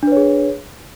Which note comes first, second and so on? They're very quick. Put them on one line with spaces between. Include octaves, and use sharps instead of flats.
D4 B4 C#5 G#4